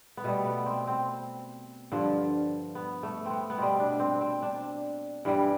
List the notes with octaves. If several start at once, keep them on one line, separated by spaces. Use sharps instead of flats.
B3
B2 G3 A3
B3
C4
C4
G2 D3 F3
B3
A3
B3 C4
B3
B2 G3 C4
D4
C4
C4
D4
G2 E3 G3